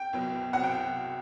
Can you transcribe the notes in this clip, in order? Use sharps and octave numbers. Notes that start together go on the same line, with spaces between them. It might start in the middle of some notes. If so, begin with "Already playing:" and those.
Already playing: G5
C2 B2 F#3
C2 C3 F#3 C4 F#5
G5